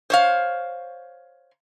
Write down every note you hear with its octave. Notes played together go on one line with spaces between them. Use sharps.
C5 C#5 F5